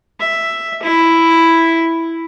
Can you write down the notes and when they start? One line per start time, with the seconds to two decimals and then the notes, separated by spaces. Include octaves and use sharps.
0.20 E5
0.83 E4